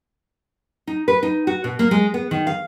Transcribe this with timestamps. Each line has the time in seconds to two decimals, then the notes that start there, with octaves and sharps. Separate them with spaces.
0.87 D#4
1.08 B4
1.23 D#4
1.47 F#4
1.64 B2
1.79 A#3
1.91 G#3
2.14 B3
2.31 D#3
2.47 F5